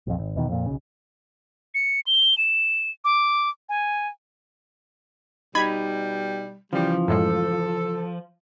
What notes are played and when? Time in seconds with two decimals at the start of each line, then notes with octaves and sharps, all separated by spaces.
0.07 A#1 F2
0.18 G#1
0.36 E2 B2 D#3
0.49 F2 A#2
0.66 B1 C#3
1.75 C#7
2.07 G7
2.38 E7
3.04 D6
3.69 G#5
5.55 B2 G3 D#4 B5 G#6
6.73 C#3 E3 F3 G3
7.08 F#2 A2 G#3 A4